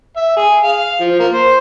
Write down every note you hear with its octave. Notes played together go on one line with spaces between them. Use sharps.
E5
G#4
F5
F3
A#3
C5